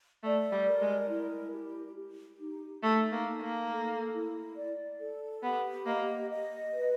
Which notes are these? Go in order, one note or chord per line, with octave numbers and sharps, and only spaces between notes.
A3 D5
G3
A#4
G#3
E4
G4
G4
D#4
A3 D#4
A#3
D#4
A#3
A4
E4
D5
A4
B3 G4
A#3 D#5
D#5
B4